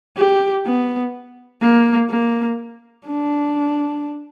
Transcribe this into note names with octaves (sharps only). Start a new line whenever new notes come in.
G4
B3
A#3
A#3
D4